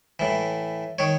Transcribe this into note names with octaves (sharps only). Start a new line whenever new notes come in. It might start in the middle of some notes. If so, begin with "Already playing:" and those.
A2 E3
D#3 C#5